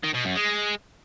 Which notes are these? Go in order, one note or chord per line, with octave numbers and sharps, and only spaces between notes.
D#3
B2
F#2
G#3